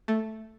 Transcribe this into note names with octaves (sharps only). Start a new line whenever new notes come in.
A3